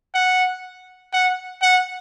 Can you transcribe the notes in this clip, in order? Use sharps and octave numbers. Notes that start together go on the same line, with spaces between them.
F#5
F#5
F#5